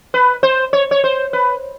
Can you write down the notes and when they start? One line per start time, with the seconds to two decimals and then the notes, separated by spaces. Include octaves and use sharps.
0.14 B4
0.43 C5
0.73 C#5
0.91 C#5
1.04 C5
1.33 B4